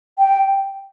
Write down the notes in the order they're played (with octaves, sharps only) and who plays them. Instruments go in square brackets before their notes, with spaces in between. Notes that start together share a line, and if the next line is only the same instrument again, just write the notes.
[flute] G5